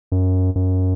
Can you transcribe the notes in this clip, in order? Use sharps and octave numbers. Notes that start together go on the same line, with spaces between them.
F#2
F#2